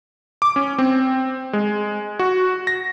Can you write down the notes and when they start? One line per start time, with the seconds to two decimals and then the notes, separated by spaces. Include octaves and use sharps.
0.42 D6
0.56 C#4
0.78 C4
1.53 G#3
2.19 F#4
2.67 A#6